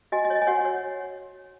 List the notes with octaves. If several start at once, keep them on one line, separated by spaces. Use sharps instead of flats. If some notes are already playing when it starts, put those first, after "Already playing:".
F#4 D#5 G#5
D#5
C#5
D#5
G#5
F#4 C#5 F#5
C#5